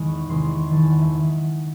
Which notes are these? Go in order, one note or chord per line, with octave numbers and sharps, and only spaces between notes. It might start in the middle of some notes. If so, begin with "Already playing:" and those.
Already playing: E2 D#3 G#3
C#6
E2 C3 D#3 G#3 C6
C#6
F#1 E2 D#3 A5
G#5
F#5
E5
D#3 E5